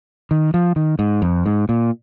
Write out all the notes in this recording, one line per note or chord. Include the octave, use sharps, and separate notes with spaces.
D#3
F3
D#3
G#2
F2
G#2
A#2